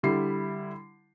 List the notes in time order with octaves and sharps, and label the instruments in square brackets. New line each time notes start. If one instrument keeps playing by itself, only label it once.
[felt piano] D3 G3 E4 C7